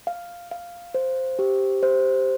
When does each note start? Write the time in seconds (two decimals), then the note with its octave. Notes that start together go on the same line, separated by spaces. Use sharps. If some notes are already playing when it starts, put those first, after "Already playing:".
0.07 F5
0.51 F5
0.95 C5
1.39 G4
1.83 C5